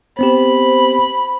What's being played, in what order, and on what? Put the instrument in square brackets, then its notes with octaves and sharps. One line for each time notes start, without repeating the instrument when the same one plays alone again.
[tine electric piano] B3 C4 G4 [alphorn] C5 [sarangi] B5